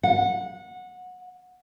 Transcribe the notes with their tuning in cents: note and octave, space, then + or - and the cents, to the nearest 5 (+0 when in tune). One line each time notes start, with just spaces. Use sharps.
F#5 -20